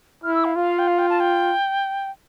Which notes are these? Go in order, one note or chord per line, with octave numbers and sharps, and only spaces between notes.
E4 F6
E6
F5
F4 F5
G5
F5
G5
A5
G5